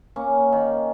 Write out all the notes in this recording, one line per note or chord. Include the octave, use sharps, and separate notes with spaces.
A#3 C#4
D#3